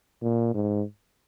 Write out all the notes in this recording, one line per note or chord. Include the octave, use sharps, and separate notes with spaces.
A#2
G#2